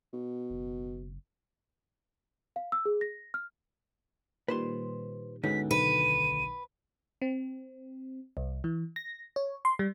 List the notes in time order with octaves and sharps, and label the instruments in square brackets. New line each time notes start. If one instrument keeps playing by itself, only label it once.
[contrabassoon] B2
[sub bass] F#1
[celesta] F5
E6
G#4
A#6
F6
[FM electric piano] A#2 D#3 G3 [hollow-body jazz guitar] B4 C5 C6
[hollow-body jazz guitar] D2 D3 D#4 [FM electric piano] G#2 B3 C#4 [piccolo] B6
[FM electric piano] B1 D#3 [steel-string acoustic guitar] B4 [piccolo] D#7
[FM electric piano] C4
C2
E3
A#6
C#5
C6
G3